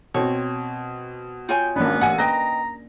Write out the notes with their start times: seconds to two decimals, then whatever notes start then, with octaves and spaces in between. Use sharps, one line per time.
0.14 B2 C4 C#5
1.49 F4 C#5 G5 G#5
1.76 G#1 A#3 B3 C#4 D4 B5
2.01 A1 F#5 G#5
2.18 B4 D#5 G5 A#5 D#6 A#6